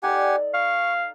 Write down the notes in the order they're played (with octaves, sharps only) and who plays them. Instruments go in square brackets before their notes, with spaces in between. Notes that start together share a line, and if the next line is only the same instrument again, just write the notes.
[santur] D#4 A4 D5 [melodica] G4 F#5 G#5
[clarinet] F5 [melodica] C#6